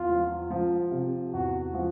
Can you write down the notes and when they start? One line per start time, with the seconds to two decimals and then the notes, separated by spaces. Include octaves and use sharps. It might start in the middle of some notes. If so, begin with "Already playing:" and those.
Already playing: E2 F4
0.09 F3
0.50 F3
0.91 C3
1.33 E2 F#4
1.74 F3